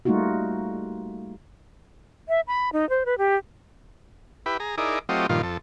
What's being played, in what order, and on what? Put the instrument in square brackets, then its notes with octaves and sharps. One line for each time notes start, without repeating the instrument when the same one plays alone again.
[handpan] G3 A3 A#3 D#4 F4 F#4
[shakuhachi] E5
B5
D#4
C5
B4
G4
[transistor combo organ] E4 G4 B4
G#4 A#5
D#4 E4 G#4 A#4 D5
F#3 A3 C4 F4 G4 D#5
G2 A#2 D#3 F3 F4
F2 A4